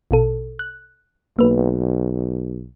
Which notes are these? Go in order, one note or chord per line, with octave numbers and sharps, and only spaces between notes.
A#1 B2 A4
F#6
B1 A#3 B4